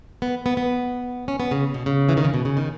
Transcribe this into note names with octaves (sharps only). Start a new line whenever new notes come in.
B3
B3
B3
C#4
B3
C#3
B2
C#3
E3
D#3
C#3
B2
C#3
D#3